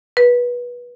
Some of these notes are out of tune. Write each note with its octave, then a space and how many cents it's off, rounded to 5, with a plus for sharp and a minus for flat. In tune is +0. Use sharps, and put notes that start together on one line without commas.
B4 -20